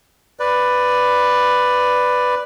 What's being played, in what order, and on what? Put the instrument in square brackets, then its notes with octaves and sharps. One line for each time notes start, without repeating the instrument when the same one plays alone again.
[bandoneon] B4 D5